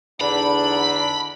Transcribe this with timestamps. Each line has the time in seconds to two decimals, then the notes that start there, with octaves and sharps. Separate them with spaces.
0.21 E2 D3 D4 D#4 B5